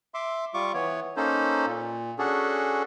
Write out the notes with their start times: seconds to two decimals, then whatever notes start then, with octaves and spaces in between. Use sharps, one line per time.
0.14 E5 C6 D6
0.54 G3 F4 C#6 D6
0.74 E3 B3 C#5
1.17 A#3 C#4 D#4 A4 C5
1.67 A#2
2.19 C#4 D4 F#4 G#4 A4